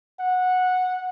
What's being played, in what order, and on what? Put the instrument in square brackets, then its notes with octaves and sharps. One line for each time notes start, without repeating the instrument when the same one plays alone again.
[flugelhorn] F#5